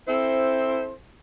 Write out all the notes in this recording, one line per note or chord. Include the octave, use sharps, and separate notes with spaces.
C4 E4 A4 C5